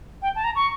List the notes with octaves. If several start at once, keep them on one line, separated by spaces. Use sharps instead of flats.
G5
A5
A#5
C#6